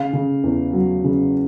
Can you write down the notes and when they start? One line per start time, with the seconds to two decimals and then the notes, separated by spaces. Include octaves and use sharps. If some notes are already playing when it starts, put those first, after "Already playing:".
Already playing: C#3 F5
0.13 C#3
0.44 E2
0.73 F#3
1.04 C#3